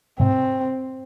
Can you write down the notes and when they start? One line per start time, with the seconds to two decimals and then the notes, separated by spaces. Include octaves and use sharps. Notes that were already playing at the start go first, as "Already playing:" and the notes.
0.20 G#2 C3 C4